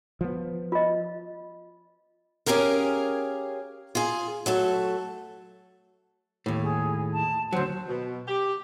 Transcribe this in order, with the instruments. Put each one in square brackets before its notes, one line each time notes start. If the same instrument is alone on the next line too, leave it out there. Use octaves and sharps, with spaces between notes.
[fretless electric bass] F3 B3
[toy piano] F4 D#5
[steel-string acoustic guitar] C#4 G4 G#4 A#4 F5
F4 G#4
F#3 A3 A4
[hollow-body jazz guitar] D#2 A2
[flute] G#4
A5
[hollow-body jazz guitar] D2 F#3 [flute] C5
[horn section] B2
G4